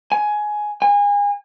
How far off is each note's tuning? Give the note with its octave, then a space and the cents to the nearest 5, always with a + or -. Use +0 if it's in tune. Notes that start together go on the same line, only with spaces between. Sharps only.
G#5 +15
G#5 -30